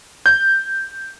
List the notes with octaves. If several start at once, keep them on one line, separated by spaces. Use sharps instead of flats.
G6